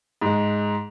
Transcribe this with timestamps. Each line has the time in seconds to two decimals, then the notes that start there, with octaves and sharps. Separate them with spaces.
0.22 G#2 G#3